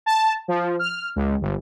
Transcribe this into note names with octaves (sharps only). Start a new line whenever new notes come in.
A5
F3
F6
C#2
G1